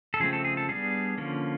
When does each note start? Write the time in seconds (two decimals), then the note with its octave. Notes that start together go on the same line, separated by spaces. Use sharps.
0.14 A4
0.20 C#3 F3 A3 C4 G#4
0.33 A4
0.44 G#4
0.57 A4
0.69 G3 B3 D4 G#4
1.18 D3 F3 A#3 C#4